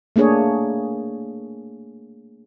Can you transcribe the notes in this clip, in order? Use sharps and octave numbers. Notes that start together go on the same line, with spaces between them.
A3 A#3 D4 G#4 C#5